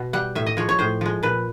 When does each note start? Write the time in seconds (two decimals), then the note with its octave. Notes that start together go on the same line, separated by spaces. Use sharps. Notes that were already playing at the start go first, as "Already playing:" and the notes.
Already playing: B2
0.13 G3 F#5
0.35 A2 E5
0.46 D#5
0.57 F3 G#3 C#5
0.69 C#5
0.79 A2 C5
1.01 F3 G#3
1.23 A#2 B4